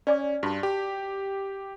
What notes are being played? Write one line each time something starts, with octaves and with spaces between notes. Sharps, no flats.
C#4 D5 G#5 D6
G2 F#4 A5
G4